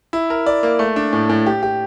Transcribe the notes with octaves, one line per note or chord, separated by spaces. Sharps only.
E4
A#4
D5
A#3
A3
D4
A2
A2
G4
G4